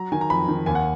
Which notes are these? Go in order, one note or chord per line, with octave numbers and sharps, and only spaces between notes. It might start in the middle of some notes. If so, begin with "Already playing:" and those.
Already playing: F#3 A#5
D#3 G#5
A#5
F2 B5
D#3
D#2 G#5
F#5